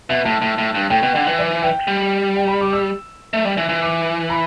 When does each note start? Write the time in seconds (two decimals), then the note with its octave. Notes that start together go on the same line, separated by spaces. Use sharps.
0.10 B2 E5
0.25 A2 A5
0.42 A2
0.58 A2
0.75 G2
0.90 A2 G5
1.03 B2
1.15 D3
1.27 E3
1.39 D5
1.63 G5
1.88 G3
2.37 G5
2.48 B5
2.61 D6
2.73 E6
3.33 A3
3.45 G3
3.57 E3
3.69 E3
3.82 D6
4.30 B5